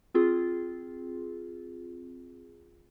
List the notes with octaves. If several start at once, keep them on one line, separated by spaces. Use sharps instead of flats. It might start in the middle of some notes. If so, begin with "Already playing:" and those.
C4 F4 G#4